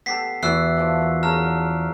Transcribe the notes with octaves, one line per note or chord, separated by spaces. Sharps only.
B3 G4 A4 B6 C7
E2 E4 F#4 G5 E6 F#6 C7
E3 F3 D5
A#4
C#4 G#4 A#4 A5 A#5 F6